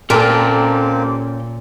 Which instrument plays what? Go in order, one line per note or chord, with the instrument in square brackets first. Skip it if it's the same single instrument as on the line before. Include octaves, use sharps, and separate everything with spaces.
[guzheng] A#2 [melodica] A#3 C4 G4 [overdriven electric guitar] C#4 G5 [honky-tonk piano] A4 A#4